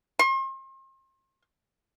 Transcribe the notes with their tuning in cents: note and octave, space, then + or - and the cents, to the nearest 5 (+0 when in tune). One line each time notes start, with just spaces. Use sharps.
C6 +40